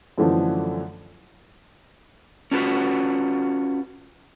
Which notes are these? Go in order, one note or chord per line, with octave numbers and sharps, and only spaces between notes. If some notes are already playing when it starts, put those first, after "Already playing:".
F#2 D3 E3 F3 A3
C#4 D4 F4 F#4 B4